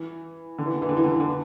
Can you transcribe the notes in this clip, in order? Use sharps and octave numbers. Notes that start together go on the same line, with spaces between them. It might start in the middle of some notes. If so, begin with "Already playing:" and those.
Already playing: E3
D3
E3
D3
E3
D3
E3
D3
E3
D3
E3